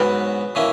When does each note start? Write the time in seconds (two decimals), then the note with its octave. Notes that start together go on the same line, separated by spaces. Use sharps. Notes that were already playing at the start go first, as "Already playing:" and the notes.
Already playing: G#2 F#3 B3 F#4 B4
0.55 B2 A#3 C#4 E4